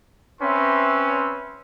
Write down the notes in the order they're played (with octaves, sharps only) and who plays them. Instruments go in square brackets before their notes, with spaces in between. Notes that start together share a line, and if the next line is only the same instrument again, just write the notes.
[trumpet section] C4 C#4 B4 E5 C6